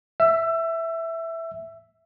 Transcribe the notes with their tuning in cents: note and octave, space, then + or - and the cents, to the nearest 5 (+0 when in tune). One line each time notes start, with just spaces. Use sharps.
E5 +0 E6 +25